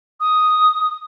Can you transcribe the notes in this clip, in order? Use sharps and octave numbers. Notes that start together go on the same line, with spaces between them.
D#6